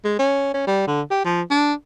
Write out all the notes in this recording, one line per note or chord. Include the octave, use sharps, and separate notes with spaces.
G#3
C#4
C#4
G3
D3
G4
F3
D4